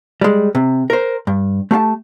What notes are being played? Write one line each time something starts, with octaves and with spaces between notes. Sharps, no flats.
G3 G#3
C3
A#4 C5
G2
A3 G4 F5 A5